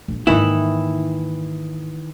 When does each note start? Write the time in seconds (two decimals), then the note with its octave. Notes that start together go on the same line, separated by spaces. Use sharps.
0.08 A#1
0.27 G#2 D#3 E3 A#3 E4